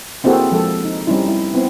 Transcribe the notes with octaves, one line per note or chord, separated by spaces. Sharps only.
A#3 C4 E4 F#4 G#4 A4
F3 G#3 A4
D#4
G3 C4 C#4 D#4 E4
E4
B3 C4 E4